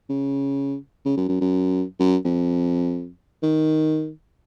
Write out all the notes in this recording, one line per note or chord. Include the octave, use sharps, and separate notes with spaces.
C#3
C#3
F#2
F#2
F#2
F#2
F2
D#3